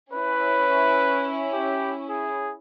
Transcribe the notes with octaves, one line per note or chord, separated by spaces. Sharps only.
C#4 E4 B4
G4
G#4